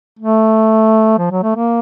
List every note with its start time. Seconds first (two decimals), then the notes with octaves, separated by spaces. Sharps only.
0.19 A3
1.19 F3
1.32 F#3
1.43 A3
1.56 A#3